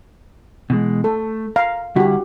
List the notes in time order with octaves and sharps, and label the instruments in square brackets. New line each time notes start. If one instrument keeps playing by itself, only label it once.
[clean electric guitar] B2 E3 G#3
[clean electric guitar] A3 [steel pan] A4
[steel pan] F5 [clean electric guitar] A#5
[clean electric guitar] D3 G3 E4 [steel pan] F#4 G4